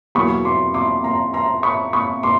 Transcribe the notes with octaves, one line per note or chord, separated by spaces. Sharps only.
E2 B2 F#3 A#3 B5 C#6
C6 D6
C6 D6
A#5 C6
A#5 C6
B5 C#6
B5 C#6
C6 D6